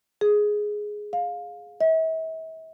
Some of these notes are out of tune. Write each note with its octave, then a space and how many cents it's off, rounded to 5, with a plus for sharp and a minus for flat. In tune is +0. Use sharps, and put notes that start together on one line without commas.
G#4 +5
F5 +20
E5 -40